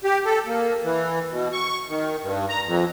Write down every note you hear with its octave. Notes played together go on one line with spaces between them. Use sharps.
G4
A4
A#3
E3
B2
C#6
D#3
G2
A#5
F2